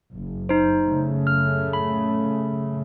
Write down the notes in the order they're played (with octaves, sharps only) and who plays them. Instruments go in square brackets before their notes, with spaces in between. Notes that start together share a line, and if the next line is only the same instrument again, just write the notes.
[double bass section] F#1
[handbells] D#4 C5
[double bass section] F#2 C#3 A3
[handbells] F6
B5